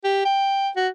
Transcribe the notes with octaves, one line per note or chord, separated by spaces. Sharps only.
G4
G5
F#4